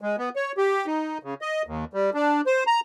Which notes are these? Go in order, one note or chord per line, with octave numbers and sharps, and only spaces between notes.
G#3
B3
C#5
G4
D#4
C#3
D#5
D#2
G3
D4
C5
A#5